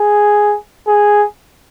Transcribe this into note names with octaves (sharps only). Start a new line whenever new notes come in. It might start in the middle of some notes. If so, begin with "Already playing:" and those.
Already playing: G#4
G#4